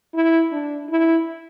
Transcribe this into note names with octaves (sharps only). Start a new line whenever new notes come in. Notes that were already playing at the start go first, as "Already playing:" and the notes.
E4
D4
E4